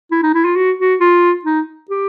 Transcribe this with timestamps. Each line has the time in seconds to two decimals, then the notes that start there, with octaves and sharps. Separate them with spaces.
0.11 E4
0.23 D#4
0.34 E4
0.45 F4
0.56 F#4
0.79 F#4
1.00 F4
1.45 D#4
1.90 G4